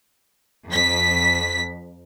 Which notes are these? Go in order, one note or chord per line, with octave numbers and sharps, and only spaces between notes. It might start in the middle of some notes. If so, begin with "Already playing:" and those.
F2 B6